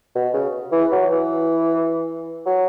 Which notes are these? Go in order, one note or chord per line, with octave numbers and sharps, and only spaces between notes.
B2
C#3
E3
F#3
E3
F#3